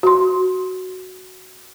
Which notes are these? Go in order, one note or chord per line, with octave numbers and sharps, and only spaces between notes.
F#4 C6